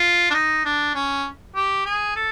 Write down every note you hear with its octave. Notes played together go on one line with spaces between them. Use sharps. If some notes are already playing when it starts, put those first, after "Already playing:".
Already playing: F4
D4
D#4
D4
C#4
G4
G#4
A4